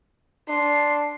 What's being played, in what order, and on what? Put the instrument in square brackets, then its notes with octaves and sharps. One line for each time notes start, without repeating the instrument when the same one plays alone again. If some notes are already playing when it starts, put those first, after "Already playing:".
[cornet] D4 [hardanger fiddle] C6